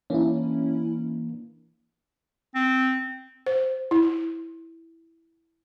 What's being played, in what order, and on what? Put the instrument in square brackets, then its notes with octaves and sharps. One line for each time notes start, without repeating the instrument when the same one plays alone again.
[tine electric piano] E3 A#3 D4 [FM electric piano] C#4 E4
[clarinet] C4
[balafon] C5
E4